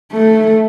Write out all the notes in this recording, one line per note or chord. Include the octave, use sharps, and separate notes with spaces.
A3